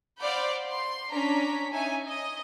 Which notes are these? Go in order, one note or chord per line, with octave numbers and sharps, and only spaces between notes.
C5 D5 F5 F#5 B5 G6
C6
C#4 D4 A#5 B6
C#4 D#4 E5 G#5
D#5